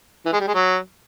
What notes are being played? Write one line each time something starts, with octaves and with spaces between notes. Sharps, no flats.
E3
G#3
G3
G#3
F#3